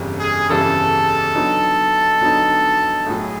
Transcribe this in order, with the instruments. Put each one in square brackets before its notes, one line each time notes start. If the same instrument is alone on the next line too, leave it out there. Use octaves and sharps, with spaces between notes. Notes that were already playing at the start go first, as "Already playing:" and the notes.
Already playing: [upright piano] G1 F2 C#3 E3 G3
[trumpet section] G#4
[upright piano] G1 F2 C#3 E3 G3 [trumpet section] A4
[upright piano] D3 F#3 B3 D#4
D3 F#3 B3 D#4
[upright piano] B1 A2 F#3 [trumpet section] G#4